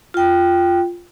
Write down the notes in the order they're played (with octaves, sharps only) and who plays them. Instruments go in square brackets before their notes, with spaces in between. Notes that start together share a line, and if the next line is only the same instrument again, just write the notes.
[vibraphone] F4 G5